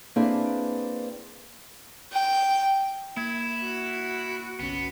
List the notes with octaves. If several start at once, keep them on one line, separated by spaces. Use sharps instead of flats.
A#3 C4 D4 E4 G#4 B4
G5
A#3 E4 G#6
F#4
G1 C2 B3 C#4